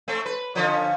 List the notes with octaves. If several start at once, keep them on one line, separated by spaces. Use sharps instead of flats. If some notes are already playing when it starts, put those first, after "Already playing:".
A3 C4 C#4
B4
D3 F3 C#4